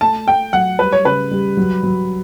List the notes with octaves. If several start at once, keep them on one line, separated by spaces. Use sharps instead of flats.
A3 A5
A3 G5
F#3 F#5
G3 B4
C#5
C#3 B4
G3
F#3
F#3